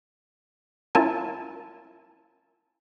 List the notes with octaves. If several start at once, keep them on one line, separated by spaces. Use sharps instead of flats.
C#4 E4 F4 A#4 G#5 A5